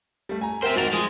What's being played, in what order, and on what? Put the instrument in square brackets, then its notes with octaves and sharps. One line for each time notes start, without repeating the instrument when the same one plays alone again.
[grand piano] G3 A3
G#5 A#5
[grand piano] A#4 G5 [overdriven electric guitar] C5 E5
[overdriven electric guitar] G#2 A#4 [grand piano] F#4 A6 F7
[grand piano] F3 [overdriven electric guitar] G#3